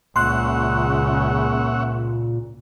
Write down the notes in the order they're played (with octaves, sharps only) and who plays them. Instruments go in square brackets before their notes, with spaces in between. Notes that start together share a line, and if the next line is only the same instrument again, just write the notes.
[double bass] C#2 C#3 [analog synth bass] A#2 [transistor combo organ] C#5 E5 F#5 [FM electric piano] C6 F#6